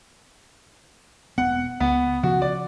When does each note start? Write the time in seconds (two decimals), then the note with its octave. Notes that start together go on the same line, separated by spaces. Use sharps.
1.38 E1 B3 F#5
1.80 C#2 B3
2.23 C#3 F3 F#4
2.42 D5